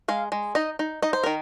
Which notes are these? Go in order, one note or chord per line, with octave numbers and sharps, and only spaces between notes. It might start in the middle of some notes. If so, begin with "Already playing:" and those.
G#3 F5
G#3
D#4 D#5
D#4
D#4 D#5
C5
D#3 A#4